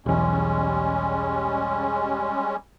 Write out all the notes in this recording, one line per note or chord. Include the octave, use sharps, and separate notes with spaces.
B1 E2 G3 G#3 C#4